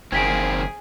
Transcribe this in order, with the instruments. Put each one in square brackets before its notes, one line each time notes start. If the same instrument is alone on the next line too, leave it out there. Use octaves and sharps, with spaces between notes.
[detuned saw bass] F#1 [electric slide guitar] D#3 A#3 C4 [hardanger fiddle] G#4 [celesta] G#6 B6 D7